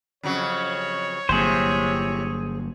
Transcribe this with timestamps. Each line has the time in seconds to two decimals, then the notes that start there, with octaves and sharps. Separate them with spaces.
0.23 F2 C#3 F#3 C#5
1.29 G1 A2 C3 F#3 A#3 G#4 C5